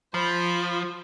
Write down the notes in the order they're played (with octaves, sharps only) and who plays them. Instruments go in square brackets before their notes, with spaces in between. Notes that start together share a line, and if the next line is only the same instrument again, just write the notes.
[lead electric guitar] F3 [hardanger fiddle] C5 B5